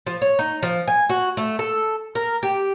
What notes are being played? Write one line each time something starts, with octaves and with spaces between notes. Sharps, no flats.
F3
C#5
D#4
F3
G#5
F#4
A3
A4
A#4
G4